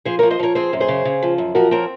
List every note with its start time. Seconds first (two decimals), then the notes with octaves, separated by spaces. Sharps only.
0.05 F3 G#4 C5
0.19 A#4 C#5
0.23 F3
0.30 C5 D#5
0.39 F3 A#4 C#5
0.55 C4 G#4 C5
0.73 F#2
0.80 G#4 C5
0.88 C#3
1.05 C#3
1.22 F3
1.38 F#2
1.55 F3 F#4 A#4
1.71 C4 A#4 C#5